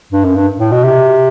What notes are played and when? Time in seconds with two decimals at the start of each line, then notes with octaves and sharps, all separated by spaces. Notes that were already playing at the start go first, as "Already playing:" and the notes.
0.12 G2
0.24 F#2
0.36 G2
0.59 A2
0.72 B2
0.84 C3